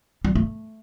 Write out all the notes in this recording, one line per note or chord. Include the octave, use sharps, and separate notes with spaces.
G3
A3